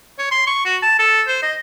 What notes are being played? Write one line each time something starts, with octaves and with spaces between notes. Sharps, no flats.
C#5
C6
C#6
F#4
A5
A4
C5
D#5